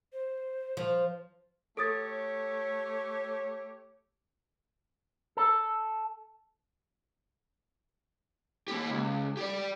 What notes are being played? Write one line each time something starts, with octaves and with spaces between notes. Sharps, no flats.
C5
F3
A3 G4 A4 C#5 D#6 A6
A4
A#3 G4
C#2
G4 D5